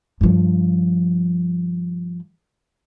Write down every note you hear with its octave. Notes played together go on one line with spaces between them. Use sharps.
G2 F3